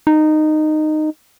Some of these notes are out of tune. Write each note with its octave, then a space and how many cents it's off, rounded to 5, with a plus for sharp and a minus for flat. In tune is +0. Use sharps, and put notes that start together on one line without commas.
D#4 -15